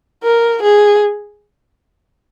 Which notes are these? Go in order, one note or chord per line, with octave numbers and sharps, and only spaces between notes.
A#4
G#4